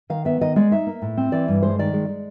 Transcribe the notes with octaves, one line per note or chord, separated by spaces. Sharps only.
D#3 F5
B3 E5
D#3 D#5
G#3 D5
D#4 E5
A#3
A2
C4
E3 D5
G2
G#3 C5
D#3 D5
G#3
G#3